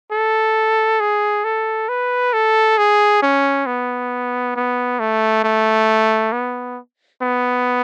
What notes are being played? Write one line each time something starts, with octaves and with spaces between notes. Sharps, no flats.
A4
G#4
A4
B4
A4
G#4
C#4
B3
B3
A3
A3
B3
B3